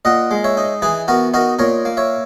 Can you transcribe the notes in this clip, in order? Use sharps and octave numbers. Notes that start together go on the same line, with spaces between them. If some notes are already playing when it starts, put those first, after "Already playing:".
A#2 D#5 F#5
G#3
C#5 E5
D#4
E3 G#4 B4
B3 F#4 A#4
D#4 F#4 A#4
A#2 A#4 C#5
A#3
C#5 E5